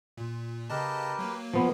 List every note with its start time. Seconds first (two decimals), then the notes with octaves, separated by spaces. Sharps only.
0.17 A#2
0.70 C#3 G4 A#4 B4 D#5 A5
1.19 F#3 A#3
1.54 F3 B3